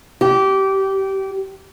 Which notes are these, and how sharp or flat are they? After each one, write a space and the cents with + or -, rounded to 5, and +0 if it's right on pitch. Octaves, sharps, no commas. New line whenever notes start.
G4 -20